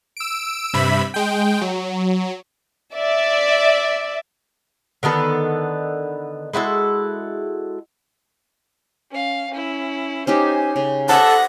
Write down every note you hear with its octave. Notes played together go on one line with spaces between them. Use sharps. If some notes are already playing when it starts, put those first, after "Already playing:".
E6 D7
G2 C3 E5 B5
G#3 G5
F#3
D5 E5
D3 D#3 B3 A4
G#3 E4 F#4 A4
C#4 F5
C#4 E4
C#4 D#4 G4 C5 G#5
C#3 C#4
A4 C5 D5 E5 F#5 F#6 A#6